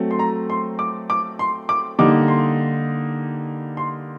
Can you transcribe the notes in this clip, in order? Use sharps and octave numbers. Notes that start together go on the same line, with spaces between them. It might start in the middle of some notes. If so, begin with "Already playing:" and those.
Already playing: F#3 A3 C4
C6
A#5
C6
D6
D6
C6
D6
D3 G3 A#3 D#4 D6
C6
C6